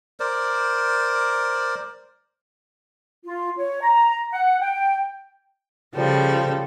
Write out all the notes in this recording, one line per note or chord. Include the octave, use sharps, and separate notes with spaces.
A#4 C5 D5
F4
C#5
A#5
F#5
G5
C#3 F3 G3 A4